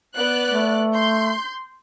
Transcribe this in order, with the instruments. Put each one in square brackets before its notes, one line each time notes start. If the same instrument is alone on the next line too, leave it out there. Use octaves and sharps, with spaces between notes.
[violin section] B3 D5 F#6
[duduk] A3
[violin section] C6 G6